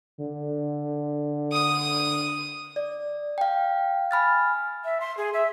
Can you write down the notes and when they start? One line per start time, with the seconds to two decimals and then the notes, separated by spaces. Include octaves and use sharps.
0.20 D3
1.52 D#6
2.76 D5
3.38 F5 G5
4.11 G#5 B5 F6 A6
4.85 E5
5.01 C6
5.17 G#4
5.33 E5